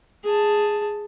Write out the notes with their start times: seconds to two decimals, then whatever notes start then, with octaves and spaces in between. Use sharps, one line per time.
0.24 G#4 A5